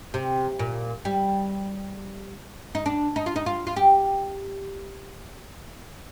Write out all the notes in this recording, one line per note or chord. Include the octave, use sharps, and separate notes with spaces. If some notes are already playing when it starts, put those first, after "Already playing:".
C3
A#2
G3
D#4
D4
D#4
F4
D#4
F4
F4
G4